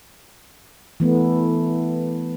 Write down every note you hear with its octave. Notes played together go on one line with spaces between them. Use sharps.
E3 A3 B3